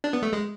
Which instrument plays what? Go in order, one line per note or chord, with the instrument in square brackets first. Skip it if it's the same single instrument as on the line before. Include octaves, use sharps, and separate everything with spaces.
[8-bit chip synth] D4
B3
A3
G#3